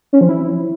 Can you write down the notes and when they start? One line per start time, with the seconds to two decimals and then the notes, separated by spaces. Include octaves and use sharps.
0.13 C#4
0.21 F3
0.29 E4